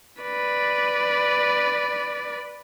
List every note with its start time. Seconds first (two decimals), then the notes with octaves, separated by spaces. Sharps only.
0.22 B4 D5